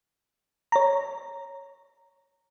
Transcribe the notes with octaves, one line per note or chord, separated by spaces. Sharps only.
C#5 A#5